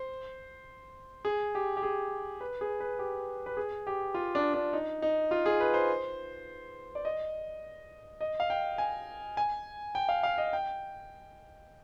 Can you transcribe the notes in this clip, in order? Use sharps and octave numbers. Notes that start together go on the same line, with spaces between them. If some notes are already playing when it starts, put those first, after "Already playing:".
Already playing: C5
G#4
G4
G4
G#4
B4
G#4
B4
G4
B4
G#4
G4
F4
D4
D4
D#4
D#4
F4
G#4
B4
C5
D5
D#5
D#5
F5
G5
G#5
G#5
G5
F5
F5
D#5
G5